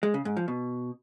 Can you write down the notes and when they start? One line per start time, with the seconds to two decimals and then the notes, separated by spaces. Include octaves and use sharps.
0.03 G#3
0.14 C#3
0.25 G#2
0.37 F3
0.48 B2